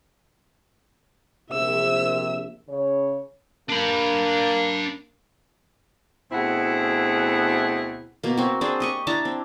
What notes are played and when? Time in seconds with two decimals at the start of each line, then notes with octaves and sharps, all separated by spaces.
1.51 A#1 C3 E5 E6
2.69 C#3 C#5
3.70 A#3 D4 B5
6.32 D2 B2 C4 E4 G#4 F#5
8.23 B2 A#3
8.37 C4 F#4
8.61 C4 D4 G#4 C5
8.80 G4 D#5 C#6
9.07 D4 E4 A5 A#5
9.25 C4